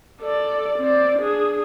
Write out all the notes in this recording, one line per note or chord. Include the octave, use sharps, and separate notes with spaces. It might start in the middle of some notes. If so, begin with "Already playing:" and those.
A4 D5
C4 D5
D4 G#4